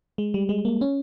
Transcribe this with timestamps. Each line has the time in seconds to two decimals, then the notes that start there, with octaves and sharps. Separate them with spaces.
0.18 G#3
0.34 G3
0.49 G#3
0.65 A#3
0.81 C#4